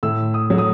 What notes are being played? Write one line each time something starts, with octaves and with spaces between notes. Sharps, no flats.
A2 E6
D#6
F#3 A3
D#6